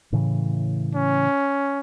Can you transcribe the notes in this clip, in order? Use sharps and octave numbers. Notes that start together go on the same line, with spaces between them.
A2 C#3 E3
C#4